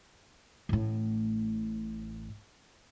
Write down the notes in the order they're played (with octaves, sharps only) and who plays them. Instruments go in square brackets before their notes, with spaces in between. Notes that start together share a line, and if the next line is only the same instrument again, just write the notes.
[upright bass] A1 A2